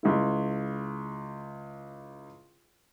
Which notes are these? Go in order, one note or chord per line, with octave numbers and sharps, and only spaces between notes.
C#2 E4